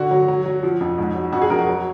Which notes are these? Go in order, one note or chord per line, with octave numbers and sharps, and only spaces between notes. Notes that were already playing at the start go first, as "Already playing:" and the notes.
Already playing: D3 F#4
F#3
F#3
F#3
F3
F2
G#2
F#3
F2 F#4
G#4
F2 A#4
F#4
F#3